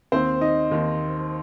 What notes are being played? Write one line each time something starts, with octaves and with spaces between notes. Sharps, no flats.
D#2 D#3 C4 C5
D#4 D#5
D#2 D#3